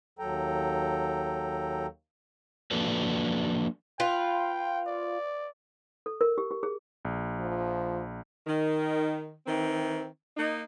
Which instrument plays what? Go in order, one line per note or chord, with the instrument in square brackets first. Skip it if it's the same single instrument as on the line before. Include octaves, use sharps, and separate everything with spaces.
[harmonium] D#2 F#3 A4 G5 A#5
[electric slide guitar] F3 A#3 D4 F#4 A4 B4
[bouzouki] F4 B4 [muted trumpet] G5
[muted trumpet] D5
[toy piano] A4
A#4
G4
G4
G#4
[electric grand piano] A#1
[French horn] F3
[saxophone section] D#3
D#3 E3 C4
A#3 D#4